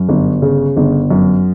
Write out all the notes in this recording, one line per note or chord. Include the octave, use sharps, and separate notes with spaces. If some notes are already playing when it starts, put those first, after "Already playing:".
Already playing: F#2
G1
C#3
G1
F#2